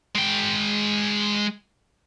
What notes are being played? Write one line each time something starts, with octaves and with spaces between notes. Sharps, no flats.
G#3 G5